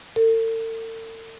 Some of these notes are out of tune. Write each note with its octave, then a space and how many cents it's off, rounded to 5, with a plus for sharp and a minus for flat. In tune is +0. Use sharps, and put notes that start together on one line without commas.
A4 +45